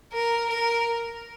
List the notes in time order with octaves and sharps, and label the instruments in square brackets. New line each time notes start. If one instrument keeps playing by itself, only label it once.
[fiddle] A#4
A#4